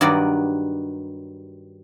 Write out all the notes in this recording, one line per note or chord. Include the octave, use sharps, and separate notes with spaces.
G2 D#3 F#3 B4 D5